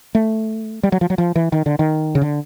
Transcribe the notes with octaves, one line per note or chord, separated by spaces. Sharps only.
A3
G3
F#3
F3
F#3
F3
E3
D#3
D3
D#3
C#3
D3